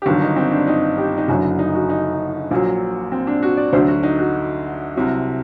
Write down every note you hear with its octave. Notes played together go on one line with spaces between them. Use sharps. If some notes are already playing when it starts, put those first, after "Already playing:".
G4
G1 G2 D#3 F#3 F#4
D#4
C4
D4
D#4
G4
D#4
F#1 F#2 D3 F#3 F#4
D#4
F#4
D#4
A#1 A#2 F#3
C4
D4
F#4
D5
D2 D3 F#3 C5
F#4
D#4
F#4
C2 C3 F#3